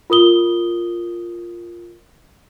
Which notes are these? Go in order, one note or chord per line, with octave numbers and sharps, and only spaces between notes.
F4 A#4 D#6 G7